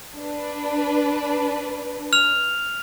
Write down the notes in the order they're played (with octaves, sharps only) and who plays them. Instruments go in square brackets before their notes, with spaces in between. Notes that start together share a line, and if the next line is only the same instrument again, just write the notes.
[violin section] D4 B4
[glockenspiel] F6 F7